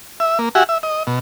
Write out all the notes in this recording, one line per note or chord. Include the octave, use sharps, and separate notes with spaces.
E5
A#3
F#4 G4 E5 F#5 G#5
E5
D#5
B2